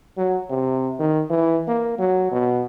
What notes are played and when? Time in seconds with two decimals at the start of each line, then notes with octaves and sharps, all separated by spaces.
0.17 F#3
0.50 C3
1.00 D#3
1.30 E3
1.68 A#3
1.99 F#3
2.31 B2